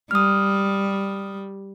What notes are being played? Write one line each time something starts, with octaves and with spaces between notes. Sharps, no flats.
G3 D#6 F6